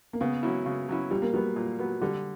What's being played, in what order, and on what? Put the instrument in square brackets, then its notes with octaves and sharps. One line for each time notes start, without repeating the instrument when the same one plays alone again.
[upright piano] A#3
[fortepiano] C#3 [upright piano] B3
[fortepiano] F#3 C#4 E4
C#3
F#3 C#4 E4
[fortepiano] A#2 [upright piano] G3
[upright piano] A#3
[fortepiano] F#3 B3 [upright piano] G3
[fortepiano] A#2
F#3 B3
[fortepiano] D3 [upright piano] G3